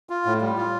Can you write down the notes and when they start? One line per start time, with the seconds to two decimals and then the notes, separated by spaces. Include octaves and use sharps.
0.10 F4
0.26 A2
0.41 G3
0.57 F4